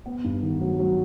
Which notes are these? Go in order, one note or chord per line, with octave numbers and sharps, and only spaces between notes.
B3
G2
D#3
F#3
F#3